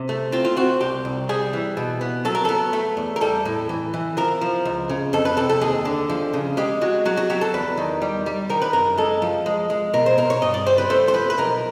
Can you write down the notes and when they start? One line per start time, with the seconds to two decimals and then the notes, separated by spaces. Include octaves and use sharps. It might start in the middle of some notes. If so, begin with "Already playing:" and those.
Already playing: C3
0.09 A3
0.32 C4 F4
0.45 F4
0.56 C4 F#4
0.81 C2 G4
1.05 C2
1.29 G3 G#4
1.53 E3
1.77 B2
2.01 B3
2.25 F#3 A4
2.35 A#4
2.45 B3 A4
2.73 A3
2.97 E2
3.16 A#4
3.21 G3 A4
3.45 A2
3.69 E3
3.94 E3
4.17 F3 A#4
4.41 F3
4.65 C#2
4.89 C#3
5.13 F2 A4
5.25 B4
5.37 C3 A4
5.49 A4
5.61 D#2 G#4
5.85 D3
6.10 F3
6.34 C#3
6.57 G#3 G4
6.81 G#3 F#4
7.05 F#3 F#4
7.17 F#4
7.30 F#3 G4
7.41 A4
7.54 E2 B4
7.77 D#3
8.02 G3
8.26 G3
8.49 D#3 A#4
8.62 B4
8.73 F#2 A#4
8.97 G#3 A4
9.22 F3
9.46 G#3
9.70 G#3
9.93 B2 A#4
10.06 C5
10.18 B2 A#4
10.30 C#5
10.42 G2 D#5
10.54 D5
10.66 G3 C5
10.78 B4
10.90 A3 C5
11.08 C5
11.14 F3 B4
11.30 B4
11.38 B1 A#4